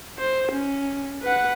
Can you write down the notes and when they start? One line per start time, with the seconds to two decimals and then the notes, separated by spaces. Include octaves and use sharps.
0.18 C5
0.52 C#4
1.23 B4 F#5